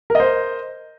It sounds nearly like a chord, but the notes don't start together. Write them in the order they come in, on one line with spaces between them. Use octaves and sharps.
A#4 D#5 C5